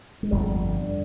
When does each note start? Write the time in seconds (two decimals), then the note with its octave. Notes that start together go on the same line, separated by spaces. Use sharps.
0.23 G#3
0.31 G1 F2 D3 G3
0.80 D3